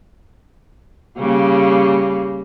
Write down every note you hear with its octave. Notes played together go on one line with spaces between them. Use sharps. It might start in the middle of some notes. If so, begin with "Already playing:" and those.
C#3 G3 A#3